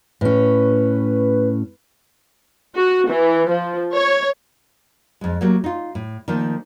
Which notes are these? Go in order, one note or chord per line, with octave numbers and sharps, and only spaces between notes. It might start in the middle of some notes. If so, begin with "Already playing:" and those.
A2 C#4 B4
F#4
E3
F3
C#5
F2 G#3
F#3 A3 A#3 G4
D#4 F4
A2
D#3 F3 A3 A#3